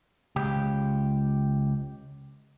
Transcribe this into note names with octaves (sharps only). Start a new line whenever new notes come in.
C#2 G4